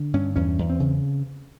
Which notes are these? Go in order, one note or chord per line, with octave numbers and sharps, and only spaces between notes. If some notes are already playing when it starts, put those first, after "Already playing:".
Already playing: D3
G2 C#4
E2 C#4
E2
C4
C#3